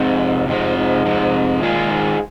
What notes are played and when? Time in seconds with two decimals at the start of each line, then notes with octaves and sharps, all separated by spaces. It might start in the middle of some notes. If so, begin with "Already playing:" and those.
Already playing: F2 G#2 C3
0.48 F2 G#2 C3 F3
0.76 G#2
1.05 F2 C3 F3
1.62 A#2 D#3 G#3 F4 G#4
1.90 G#2